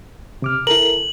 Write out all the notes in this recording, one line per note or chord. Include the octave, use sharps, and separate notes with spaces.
C3 D6 F6
E4 A4 A#4 F#7